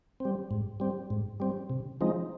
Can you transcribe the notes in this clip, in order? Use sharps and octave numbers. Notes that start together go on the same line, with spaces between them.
G3 C4
G#2
G3 C4
G#2
G3 C4
C3
F3 G#3 C4 D#4